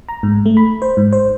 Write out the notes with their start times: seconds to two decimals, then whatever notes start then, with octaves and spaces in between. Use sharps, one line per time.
0.09 A#5
0.23 G#2
0.46 A3
0.57 B5
0.82 C5
0.97 G#2
1.13 C5